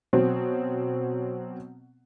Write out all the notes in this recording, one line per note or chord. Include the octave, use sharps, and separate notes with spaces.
B2 F#3 C4